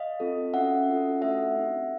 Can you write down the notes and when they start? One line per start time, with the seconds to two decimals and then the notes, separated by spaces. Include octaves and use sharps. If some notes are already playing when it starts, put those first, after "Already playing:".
Already playing: D#5 F5
0.20 C4 F4 A4
0.53 C#4 F#4 A4 E5 F#5
0.88 C#4 F4 A4
1.22 A3 D4 F#4 A4 E5 F#5
1.56 C4 D#4 G4